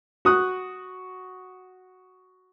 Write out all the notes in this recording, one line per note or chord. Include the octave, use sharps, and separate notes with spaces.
F#4 D#6 F#6